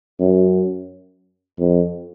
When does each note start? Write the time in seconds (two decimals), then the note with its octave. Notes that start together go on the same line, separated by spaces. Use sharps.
0.20 F#2
1.59 F2